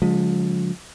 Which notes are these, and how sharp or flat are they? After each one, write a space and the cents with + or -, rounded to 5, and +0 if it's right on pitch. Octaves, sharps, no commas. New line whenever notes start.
D3 -35 F3 +40 G#3 +0